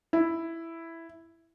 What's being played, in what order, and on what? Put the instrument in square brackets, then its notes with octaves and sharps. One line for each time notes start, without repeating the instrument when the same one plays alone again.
[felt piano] E4